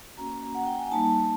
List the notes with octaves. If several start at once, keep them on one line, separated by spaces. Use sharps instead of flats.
A#3 C#4 F#4 A#5
F#5
G5
G#5
G3 A#3 D#4 A5